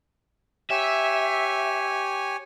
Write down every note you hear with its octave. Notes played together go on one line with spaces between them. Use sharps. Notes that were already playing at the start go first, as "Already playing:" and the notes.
G4 C#5 E5 G#5